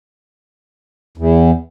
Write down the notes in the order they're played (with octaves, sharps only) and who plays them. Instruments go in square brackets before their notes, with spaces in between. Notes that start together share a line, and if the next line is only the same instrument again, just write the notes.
[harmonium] E2